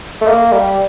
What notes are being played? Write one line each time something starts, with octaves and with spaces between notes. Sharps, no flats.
A3
A#3
G3